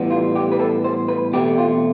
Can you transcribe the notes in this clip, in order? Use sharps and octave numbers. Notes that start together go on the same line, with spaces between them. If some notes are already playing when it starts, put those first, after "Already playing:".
Already playing: A2 E3 G3 B3
F4
G4
B4
A4
C5
B4
E2 B2 A3 C4 G4
F4